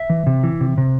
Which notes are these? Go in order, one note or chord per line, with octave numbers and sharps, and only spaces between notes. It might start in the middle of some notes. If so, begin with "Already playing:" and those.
Already playing: E5
E3
C3
E3
C3
C3